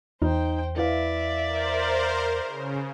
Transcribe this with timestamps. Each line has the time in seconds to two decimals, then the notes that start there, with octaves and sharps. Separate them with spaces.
0.22 E2 D#4 C5 G5
0.76 E4 B4 D5 E5 F5
1.46 A#4 C5
2.44 C#3